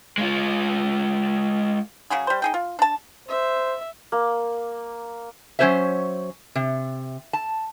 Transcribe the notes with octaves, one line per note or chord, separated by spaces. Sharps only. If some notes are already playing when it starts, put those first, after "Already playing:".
G#3 F4
C#3 F#3 F#4 G#4
G3 C5
D#4 G#4 G5
F4
D4 A5
C5 E5
A#3
F#3 C#4 E4 C5 C#5 E5
C3
A5